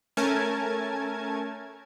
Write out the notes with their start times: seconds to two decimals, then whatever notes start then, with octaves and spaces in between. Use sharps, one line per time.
0.17 A3 C#4 A#4 G#5 A5 G#6